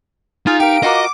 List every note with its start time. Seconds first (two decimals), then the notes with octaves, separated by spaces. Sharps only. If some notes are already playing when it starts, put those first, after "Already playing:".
0.47 D#4 F4 G#4
0.60 G4 A#4 F5 D7
0.83 F4 F#4 A#4 D#5 D6